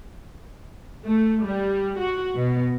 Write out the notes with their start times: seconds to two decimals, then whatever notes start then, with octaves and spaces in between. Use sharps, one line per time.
1.05 A3
1.45 G3
2.00 F#4
2.37 B2